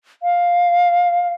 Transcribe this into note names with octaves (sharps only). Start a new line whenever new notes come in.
F5